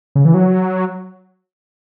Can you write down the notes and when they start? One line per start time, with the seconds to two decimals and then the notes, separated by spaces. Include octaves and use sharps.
0.15 C#3
0.25 E3
0.34 F#3